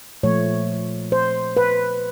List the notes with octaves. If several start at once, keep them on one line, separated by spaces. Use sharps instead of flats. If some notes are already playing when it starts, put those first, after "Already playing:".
A#2 F3 A3 C#5
C5
B4